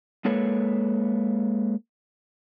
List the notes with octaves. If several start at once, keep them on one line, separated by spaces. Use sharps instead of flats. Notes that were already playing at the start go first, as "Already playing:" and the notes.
G#3 A#3 A4 B4 C#5